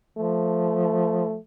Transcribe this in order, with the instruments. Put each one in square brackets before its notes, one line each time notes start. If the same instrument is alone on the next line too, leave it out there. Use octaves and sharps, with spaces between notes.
[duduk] F3 [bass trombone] A3